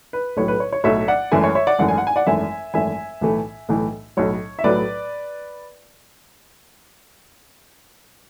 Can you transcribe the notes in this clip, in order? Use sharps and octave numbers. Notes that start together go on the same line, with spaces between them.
B4
B1 A2 F#3 A3 C#5
B4
C#5
C#5
B1 A2 F#3 A3 C#5 E5
D5 F#5
G#1 F#2 E3 A3 E5 G#5
C#5
C#5 E5
D5 F#5
G#1 F#2 E3 A3 F#5
G#5
F#5
G#5
D5 F#5
G#1 F#2 E3 A3 E5 G#5
G#1 F#2 E3 A3 E5 G#5
B1 A2 E3 A3
B1 A2 E3 A3
B1 A2 F#3 C#5
E5
B1 A2 F#3 B4 D5